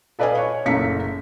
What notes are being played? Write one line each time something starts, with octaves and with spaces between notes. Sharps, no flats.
A4 B4 D5 D#5 F5 G#5
C#5
F#1 F#2 A3 A#5 B6 C#7